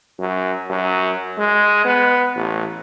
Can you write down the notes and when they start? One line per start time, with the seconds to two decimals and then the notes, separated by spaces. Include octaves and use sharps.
0.19 F#2
0.70 F#2
1.38 G#3
1.85 B3
2.36 A1